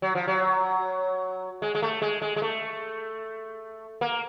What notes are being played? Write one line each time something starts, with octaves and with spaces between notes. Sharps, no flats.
F#3
F3
F#3
G#3
G#3
A3
G#3
G#3
G#3
A3
A#3